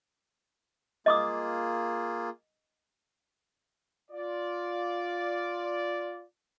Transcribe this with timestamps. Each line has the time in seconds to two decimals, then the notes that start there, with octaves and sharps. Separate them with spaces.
1.06 A#3 F4 G#4 D#5 D6 D#6
4.11 F4 D5